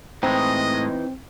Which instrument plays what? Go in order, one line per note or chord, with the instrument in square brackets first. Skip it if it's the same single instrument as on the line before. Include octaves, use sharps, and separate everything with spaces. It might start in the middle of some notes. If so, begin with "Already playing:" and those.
[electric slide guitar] A2 G#3 [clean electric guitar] E3 D#4 [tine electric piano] C4 [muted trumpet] D#5